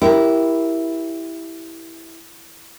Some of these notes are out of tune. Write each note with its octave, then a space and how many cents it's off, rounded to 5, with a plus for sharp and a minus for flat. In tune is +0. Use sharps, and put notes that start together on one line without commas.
E4 +0 G4 +0 A#4 +15